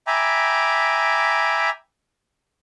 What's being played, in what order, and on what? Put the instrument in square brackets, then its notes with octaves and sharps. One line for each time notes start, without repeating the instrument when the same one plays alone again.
[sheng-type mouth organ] E5 G5 G#5 A#5 B5 D6